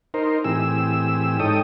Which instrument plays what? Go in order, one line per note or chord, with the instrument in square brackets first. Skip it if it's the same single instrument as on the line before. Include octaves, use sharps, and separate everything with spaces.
[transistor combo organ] D#4 A#4 C5
A2 E3 C4 G4 G#4 E6
G#2 D#4 A4 C#5 G5 D#6